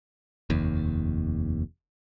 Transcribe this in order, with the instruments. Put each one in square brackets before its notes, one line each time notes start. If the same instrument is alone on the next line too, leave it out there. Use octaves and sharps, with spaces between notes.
[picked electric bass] F1 D#2